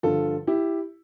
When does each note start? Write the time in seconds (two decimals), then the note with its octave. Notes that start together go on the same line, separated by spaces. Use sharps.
0.03 G2 D3 F3 F4 A4
0.47 E4 G4